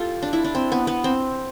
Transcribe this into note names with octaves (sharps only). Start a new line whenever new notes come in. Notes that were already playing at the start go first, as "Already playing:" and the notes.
Already playing: F4 G4 A4
D4
E4
D4
C4
B3
B3
C4